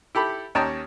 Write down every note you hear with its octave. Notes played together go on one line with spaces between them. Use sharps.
E4 G4 A4 B5
D#2 C#4 D#5 G5 A5 A#5